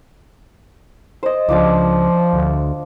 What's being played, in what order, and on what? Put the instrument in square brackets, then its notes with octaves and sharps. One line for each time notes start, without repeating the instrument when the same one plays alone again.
[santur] C5 D#5
[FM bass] C#2 [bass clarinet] F3 [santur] D4 F4 D6
[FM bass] D2